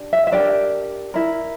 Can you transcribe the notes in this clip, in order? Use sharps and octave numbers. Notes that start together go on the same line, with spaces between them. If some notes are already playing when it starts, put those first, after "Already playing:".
Already playing: D4 G4
E5
E5
D4 G4 A#4 D5
E4 A#4